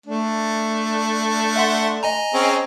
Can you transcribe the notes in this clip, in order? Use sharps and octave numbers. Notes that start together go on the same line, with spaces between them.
A3 D4
E5 F#5 C6
D#5 G#5 A#5
C4 C#4 G#4